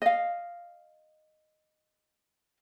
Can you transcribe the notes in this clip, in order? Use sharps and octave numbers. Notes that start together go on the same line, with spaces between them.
D#5 F5